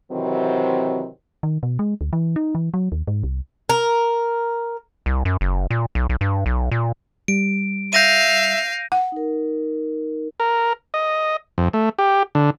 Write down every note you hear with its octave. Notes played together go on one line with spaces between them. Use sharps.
C3 D#3 E3 F#3 C4
D#3
B2
G#3
D2
E3
D#4
E3
F#3
D#2
G#2
C2
A#4
C2
F#2
F#1
A#2
B1
B1
G2
B1
A#2
G3 D7
E5 F5 G6 A#6 D#7
F#5
D#4 A#4
A#4
D#5
F2
A3
G4
D3